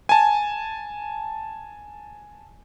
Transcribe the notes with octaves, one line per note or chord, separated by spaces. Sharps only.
G#5 A5